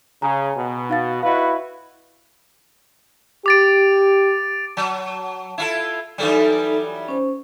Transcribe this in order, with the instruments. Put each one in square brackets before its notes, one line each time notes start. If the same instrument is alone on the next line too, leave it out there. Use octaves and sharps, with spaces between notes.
[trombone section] C#3 [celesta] G#5 A#5
[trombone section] B2
[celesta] D#4 F5 A6
[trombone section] E4 F#4 B4 [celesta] D#5 F5
[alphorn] G4 [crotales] D6 A6 D7
[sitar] F#3 [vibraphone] A5
[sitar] E4 F4 A4
[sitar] E3 F#3 G3 [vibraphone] D#4 A4 D5
[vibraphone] C#4 C5